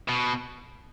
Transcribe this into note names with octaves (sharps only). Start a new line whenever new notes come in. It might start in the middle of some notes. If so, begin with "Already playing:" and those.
B2